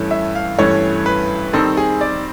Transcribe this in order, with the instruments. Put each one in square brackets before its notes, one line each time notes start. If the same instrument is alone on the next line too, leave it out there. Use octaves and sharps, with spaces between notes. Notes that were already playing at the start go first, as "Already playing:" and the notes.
Already playing: [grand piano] G2 E3 A3 C#4
E5
F5
G2 E3 A3 C#4 C#5
B4
D#3 G3 C4 D#4 A4
G#4
D5